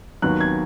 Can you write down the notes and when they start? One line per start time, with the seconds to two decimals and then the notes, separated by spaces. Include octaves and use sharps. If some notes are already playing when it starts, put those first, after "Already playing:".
0.22 D#2 D#3 F#3 B3 F#6
0.41 G#6